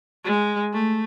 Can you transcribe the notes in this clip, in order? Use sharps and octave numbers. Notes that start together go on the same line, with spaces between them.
G#3
A3